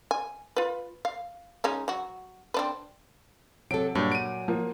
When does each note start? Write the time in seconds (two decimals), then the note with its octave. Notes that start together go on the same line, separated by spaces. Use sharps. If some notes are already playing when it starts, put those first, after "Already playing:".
0.11 G#5
0.56 F4 B4
1.05 F5
1.64 G#3 C#4 D#4
1.88 F#3 F#4
2.54 C4 D4 B4
3.71 C3 F#3 A4 D7
3.95 G2 A#2 F#3
4.12 D7 D#7
4.48 F3 A#3